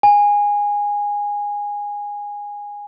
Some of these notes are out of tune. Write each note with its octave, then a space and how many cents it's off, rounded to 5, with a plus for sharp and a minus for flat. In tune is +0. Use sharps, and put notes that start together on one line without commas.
G#5 -15